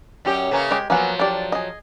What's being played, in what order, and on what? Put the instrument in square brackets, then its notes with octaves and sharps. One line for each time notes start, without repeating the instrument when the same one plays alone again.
[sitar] F#2 C#4 G4 [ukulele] D5 G5
[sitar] C#3 A#3 C#4 [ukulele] B4 E5
[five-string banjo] G#3 G4 [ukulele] A#4
[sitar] F3 F#3 [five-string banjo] A#3 B3 F#5 [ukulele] G#5
[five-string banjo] D4 D5 [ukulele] G4 A4 A#4
[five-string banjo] G#4 D#5